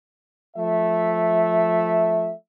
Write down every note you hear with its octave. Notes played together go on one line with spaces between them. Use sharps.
F3 A3 E5